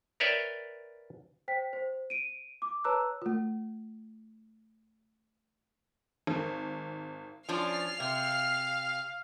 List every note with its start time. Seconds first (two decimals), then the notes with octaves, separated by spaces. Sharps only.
0.20 A#4 B4 C#5 D5 E5 G5
1.48 C5 G5 B6
1.73 C5
2.10 D7 D#7
2.62 D6
2.84 B4 C#5 A5 A#5 E6 F#6
3.22 A3 F4
6.27 G#1
7.49 F3 C#4 D4 F6 C7
8.00 C3 F5